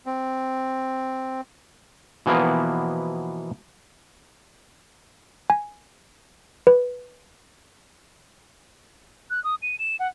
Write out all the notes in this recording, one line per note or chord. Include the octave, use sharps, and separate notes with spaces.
C4
B2 E3 F3 A#3 B3
G#5
B4
F#6
D#6
D#7
E7
F#5